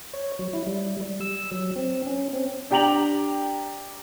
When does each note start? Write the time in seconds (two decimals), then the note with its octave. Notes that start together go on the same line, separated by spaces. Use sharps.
0.13 C#5
0.39 F#3
0.53 E4
0.67 G3
1.01 G3
1.21 E6
1.51 F#3
1.76 C4
2.07 C#4
2.33 C4
2.71 D4 G4 G5 A#5 F7 F#7